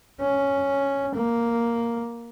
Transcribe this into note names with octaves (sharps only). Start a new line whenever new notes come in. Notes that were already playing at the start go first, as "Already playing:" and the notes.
C#4
A#3